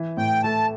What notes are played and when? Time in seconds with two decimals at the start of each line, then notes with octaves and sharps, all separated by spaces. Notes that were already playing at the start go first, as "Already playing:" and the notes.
Already playing: E3
0.17 A2 G5
0.43 A3 A5